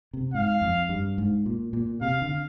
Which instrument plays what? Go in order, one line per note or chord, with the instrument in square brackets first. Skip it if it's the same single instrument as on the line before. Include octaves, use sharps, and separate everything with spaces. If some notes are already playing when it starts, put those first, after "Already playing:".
[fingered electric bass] C3
[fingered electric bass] G#2 [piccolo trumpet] F5
[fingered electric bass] F2
G2
G#2
A#2
A#2
[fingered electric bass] C3 [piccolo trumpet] F5
[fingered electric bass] D3